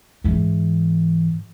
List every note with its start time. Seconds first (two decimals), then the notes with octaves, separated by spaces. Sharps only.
0.24 G#2 E3